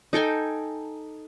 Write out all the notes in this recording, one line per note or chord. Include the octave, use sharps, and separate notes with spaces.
D#4 A4 G5 G#5